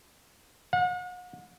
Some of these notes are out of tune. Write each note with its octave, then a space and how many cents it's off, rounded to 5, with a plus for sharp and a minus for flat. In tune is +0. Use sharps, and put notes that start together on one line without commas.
F#5 -40